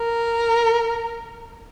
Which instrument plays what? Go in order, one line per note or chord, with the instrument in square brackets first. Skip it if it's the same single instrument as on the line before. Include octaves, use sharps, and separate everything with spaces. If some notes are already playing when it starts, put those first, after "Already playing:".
Already playing: [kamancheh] A#4